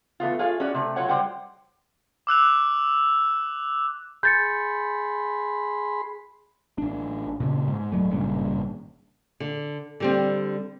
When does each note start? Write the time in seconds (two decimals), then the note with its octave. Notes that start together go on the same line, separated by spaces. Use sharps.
0.20 E3 A3 B3 F4
0.39 F4 G#4 C#5 F5
0.60 C#4 E4 F#4 D5
0.74 C3 A3
0.96 F#3 F4 C#5 F#5
1.09 F#3 G3 C5 F#5 G5
2.27 D6 E6 F#6 F7
4.23 G#4 B5 C6 G6 A6 C#7
6.78 A1 D4
7.40 A#2 C#3
7.68 G#2
7.92 D#1 F#2 F#3 A3
8.11 G#1 G2 A#2 C#3
9.40 D3
10.00 D3 G3 C4